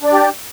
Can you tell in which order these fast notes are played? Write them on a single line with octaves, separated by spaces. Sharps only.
D4 D5 G4